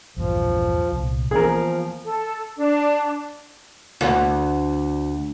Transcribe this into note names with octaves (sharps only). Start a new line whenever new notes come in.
A#1 E2 G2 F3
C2 A#2
E3 F3 A#3 B3 G#4 A#4
A4
D4
D2